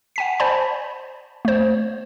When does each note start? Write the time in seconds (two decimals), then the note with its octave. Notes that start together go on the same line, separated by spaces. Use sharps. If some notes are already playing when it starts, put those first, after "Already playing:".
0.16 F#5 G#5 B6
0.40 C5 D5 G#5 A5 B5
1.45 A3 C5